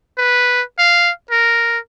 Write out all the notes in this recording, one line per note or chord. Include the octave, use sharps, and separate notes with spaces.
B4
F5
A#4